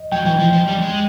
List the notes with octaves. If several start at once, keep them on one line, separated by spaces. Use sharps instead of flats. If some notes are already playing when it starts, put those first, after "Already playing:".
Already playing: D#5
F#3 G5
E3
F3
F3
G3
G#3